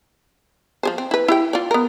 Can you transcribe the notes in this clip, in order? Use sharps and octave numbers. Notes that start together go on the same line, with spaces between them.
F3 G#4 C5
C4
E4 B4
E4 G4 G5
F4 D5
B3 A#4